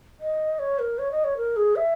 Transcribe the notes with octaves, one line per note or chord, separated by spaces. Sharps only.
D#5
C#5
A#4
C#5
D#5
C#5
A#4
G#4
E5